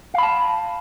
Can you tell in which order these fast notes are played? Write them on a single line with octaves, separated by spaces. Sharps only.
F5 B5 A5